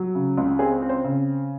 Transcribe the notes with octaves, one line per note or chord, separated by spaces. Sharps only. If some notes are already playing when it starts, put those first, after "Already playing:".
Already playing: F#3
C#3
C#2
C4 G#4
C4
C5
C#3